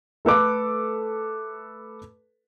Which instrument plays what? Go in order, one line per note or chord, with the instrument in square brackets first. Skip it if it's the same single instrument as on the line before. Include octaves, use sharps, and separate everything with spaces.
[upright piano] A3 A4 B4 D6